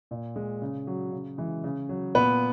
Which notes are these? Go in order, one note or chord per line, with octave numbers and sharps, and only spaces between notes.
A#2
G#3
C#3
F#3
C#3
E3 G#3
C#3
F#3
A#2 B3 B4